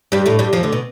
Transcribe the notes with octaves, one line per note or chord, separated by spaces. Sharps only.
G2 G3
A2 A3
G2 G3
F2 F3
D2 D3
B2